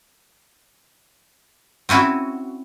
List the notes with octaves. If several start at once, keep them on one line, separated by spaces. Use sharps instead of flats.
C4 C#4 E4 F#4